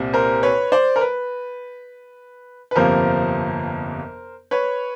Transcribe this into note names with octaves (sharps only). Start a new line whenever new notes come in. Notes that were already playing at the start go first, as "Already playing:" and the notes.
Already playing: C2 A#2 G3 C4
A#4 C5
B4 C#5
C5 D5
A#4
B4
B4
G1 F2 C3 F3 A#3 A#4 C5
B4 C#5